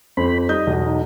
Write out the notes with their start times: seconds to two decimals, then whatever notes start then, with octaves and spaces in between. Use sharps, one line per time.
0.17 F2 C5 B5
0.49 G3 D#4 D#5 G6
0.67 B1 E2
0.86 D#4